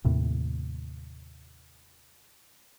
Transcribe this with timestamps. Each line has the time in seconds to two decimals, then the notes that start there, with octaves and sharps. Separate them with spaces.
0.05 D#2 A2 C3